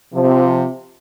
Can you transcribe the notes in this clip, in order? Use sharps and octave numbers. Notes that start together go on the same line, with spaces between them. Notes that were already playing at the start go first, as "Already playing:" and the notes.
C3 F3